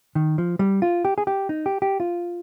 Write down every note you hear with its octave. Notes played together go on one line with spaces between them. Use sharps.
D#3
F3
G3
F4
G4
G#4
G4
D#4
G4
G4
F4